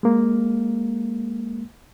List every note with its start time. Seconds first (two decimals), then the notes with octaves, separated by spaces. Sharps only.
0.03 G#3 A#3